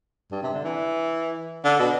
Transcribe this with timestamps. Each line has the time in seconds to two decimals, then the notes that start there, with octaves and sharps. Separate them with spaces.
0.32 G2
0.43 C3
0.53 D3
0.64 E3
1.65 D3
1.79 B2